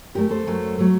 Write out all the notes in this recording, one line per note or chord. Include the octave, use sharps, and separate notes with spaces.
F#2 F#3 A3 G4 A#4
A4 C5
F#2 F#3 A3
F#3 A3